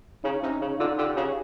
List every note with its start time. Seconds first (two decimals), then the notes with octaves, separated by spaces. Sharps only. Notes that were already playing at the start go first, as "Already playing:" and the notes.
0.24 C#3 C#4 D#4
0.42 C3 C#4 D#4
0.61 C#3
0.80 D3 D#4 F4
0.98 D3 F4 G4
1.16 C#3 F#4 G#4